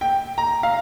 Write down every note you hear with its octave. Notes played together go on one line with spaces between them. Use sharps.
G5
A#5
F5